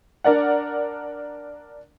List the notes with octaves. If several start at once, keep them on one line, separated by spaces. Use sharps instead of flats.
D4 A#4 D5 F#5